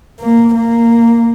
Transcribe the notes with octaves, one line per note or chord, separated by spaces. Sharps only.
A#3
A#3